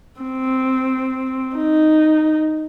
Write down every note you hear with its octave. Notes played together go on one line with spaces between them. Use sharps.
C4
D#4